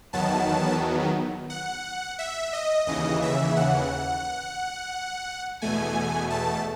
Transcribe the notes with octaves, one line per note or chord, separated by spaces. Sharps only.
E2 D#3 F#3 B3 A5
F#5
E5
D#5
D#2 C#3 E3 D#5
E5
F#5
E2 B2 A3 G#5
A5